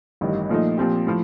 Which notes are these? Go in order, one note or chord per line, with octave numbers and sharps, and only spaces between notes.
A1 G2 D#3
A#2 F3 A3 D#4
A#2 F3 C4 G4
A2 F3